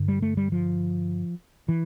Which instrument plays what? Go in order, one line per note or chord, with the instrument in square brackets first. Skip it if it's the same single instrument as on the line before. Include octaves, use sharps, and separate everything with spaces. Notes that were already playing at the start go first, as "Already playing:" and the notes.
Already playing: [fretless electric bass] G2 D3
G3
A3
G3
F3
E3